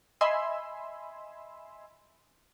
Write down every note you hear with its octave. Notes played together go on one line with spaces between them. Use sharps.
D#5 E5 G#5 B5 C6 E6